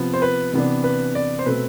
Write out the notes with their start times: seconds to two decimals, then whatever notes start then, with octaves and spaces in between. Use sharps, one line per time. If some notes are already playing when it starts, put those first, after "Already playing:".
Already playing: C3 F3 B3
0.14 C5
0.22 B4
0.53 C3 E3 B3 D4
0.84 B4
1.15 D5
1.39 C5
1.46 B2 A3 C4 B4